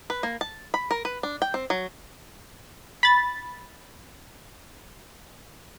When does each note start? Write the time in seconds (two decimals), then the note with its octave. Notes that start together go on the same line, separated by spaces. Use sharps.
0.10 B4
0.23 A#3
0.41 A5
0.74 B5
0.91 A#4
1.05 B4
1.23 D4
1.42 G5
1.54 C4
1.70 F#3
3.03 B5 A6